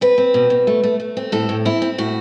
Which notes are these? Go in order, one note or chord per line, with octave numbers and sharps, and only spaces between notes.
C4 B4
C4
B2
B2
A3
A3
A3
C4
A2 A4
A2
C4 E4
C4
A2 F#4